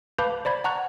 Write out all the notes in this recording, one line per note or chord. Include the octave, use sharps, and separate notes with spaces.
B4 F5 A5 B5 D6 G6
C5 D5 B5 G#6
F#5 A5 A#5 C#6 F#6